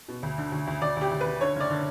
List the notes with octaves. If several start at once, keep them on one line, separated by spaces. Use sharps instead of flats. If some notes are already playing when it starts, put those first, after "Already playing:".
B2
D2
D3
D2
D2
D2 D5
D2 G4
D2
B4
D2
D3 C#5
F#1 D5
D3